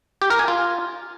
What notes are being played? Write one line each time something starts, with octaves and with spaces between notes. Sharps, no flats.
G4
A#4
G#5
F4